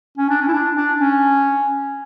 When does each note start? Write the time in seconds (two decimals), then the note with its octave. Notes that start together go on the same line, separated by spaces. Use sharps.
0.18 C#4
0.30 D4
0.41 C#4
0.48 E4
0.53 D4
0.77 D4
1.00 C#4